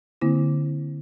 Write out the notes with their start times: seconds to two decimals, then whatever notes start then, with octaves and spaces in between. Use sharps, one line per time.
0.21 D3 A#3 C4 E4